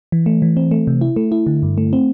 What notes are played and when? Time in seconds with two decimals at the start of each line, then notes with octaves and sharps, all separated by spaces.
0.12 E3
0.26 A3
0.42 E3
0.57 C4
0.71 A3
0.87 C3
1.01 E4
1.16 A3
1.32 E4
1.47 D3
1.63 G2
1.78 A3
1.93 C4